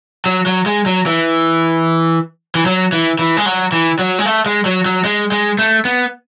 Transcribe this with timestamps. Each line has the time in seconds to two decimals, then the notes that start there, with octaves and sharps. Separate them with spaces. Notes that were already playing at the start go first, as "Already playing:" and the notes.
0.26 F#3
0.46 F#3
0.66 G#3
0.86 F#3
1.06 E3
2.55 E3
2.66 F#3
2.92 E3
3.19 E3
3.37 G#3
3.46 F#3
3.72 E3
3.99 F#3
4.19 G#3
4.26 A3
4.46 G#3
4.66 F#3
4.86 F#3
5.05 G#3
5.32 G#3
5.59 A3
5.85 B3